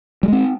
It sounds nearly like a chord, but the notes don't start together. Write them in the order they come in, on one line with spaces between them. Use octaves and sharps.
G3 G#3 C4